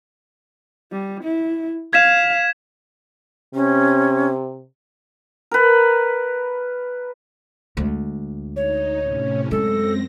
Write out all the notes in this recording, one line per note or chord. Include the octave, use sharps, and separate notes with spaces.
G3
E4
F5 G#6 B6 E7
C3 C#4
A#4 B4
D2 G#3
D#4 C#5
A2 C3 C#4
F#2 G#3 C4 A4 A#6